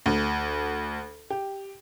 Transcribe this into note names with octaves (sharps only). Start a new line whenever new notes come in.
D2
G4